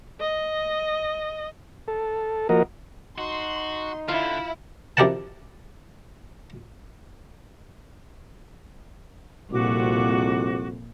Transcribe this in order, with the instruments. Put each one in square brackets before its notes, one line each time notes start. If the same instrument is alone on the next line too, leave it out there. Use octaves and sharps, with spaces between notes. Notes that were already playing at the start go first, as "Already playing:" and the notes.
[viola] D#5
[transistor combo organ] A4
F3 A#3 F#4 A#4 D#5
[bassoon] D#4 [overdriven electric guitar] F#4 [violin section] C6
[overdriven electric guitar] D3 [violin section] E4 [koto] F4
[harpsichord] F2 E4 G4 A#4 F#5 A5
[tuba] C2 [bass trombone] F2 [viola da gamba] A#2 [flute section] F#4 D6